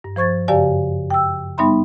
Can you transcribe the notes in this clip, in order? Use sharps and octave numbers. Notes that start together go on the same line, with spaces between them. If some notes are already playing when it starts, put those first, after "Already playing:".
G2
F3 C5 C#6 G#6 A6
F#2 C#3 G4 D5 F5 G#5
G5 E6
G3 B3 D#4 E5 B5 C6